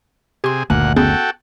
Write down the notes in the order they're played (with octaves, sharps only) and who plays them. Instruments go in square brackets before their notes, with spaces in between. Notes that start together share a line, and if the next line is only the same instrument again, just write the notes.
[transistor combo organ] C3 G#4 [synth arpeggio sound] G4 C6
[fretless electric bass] F#1 D2 [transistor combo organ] A#2 F#5 [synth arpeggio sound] A3 G#5
[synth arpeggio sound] B3 C#4 G#4 [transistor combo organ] F#4 A4 G5